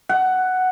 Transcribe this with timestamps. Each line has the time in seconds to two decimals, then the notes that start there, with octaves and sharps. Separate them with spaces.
0.09 F#5